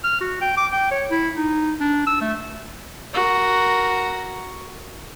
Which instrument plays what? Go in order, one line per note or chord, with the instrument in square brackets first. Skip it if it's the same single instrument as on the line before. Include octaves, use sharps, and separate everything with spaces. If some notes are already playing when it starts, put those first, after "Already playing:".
[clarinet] F6
F#4
G5
D6
G5
C#5
E4
D#4
D4
E6
A3
[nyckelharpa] F#4 A#4